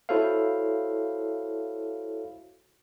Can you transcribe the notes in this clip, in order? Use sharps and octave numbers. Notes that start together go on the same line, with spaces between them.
E4 F#4 A4 C5 C#5 F5